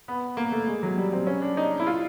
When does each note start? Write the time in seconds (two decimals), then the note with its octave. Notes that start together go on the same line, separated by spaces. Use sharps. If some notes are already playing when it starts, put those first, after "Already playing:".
0.08 B3
0.37 A#3
0.52 A3
0.67 G#3
0.83 F#3
0.98 G3
1.13 C4
1.27 C#4
1.42 D4
1.57 D#4
1.79 E4
1.87 F4